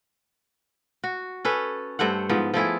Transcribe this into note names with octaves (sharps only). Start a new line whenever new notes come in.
F#4
C#4 A4 B4
G2 A3 C5 F#5
G#2 F3 B3
F3 A3 E4 G#4